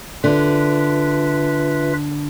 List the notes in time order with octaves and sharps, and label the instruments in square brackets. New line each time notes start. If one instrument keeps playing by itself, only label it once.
[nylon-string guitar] D3 [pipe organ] F4 B4 E5